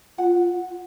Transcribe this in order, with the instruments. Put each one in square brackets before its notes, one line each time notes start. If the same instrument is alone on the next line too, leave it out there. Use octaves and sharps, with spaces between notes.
[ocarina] F4 [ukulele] F#5